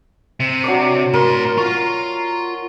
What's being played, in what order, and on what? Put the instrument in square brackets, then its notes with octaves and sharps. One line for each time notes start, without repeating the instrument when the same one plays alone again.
[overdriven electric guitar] C3
[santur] F#3 D4 D5
[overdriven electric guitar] A2 C6 [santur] A#4
[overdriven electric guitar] F4 [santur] C#6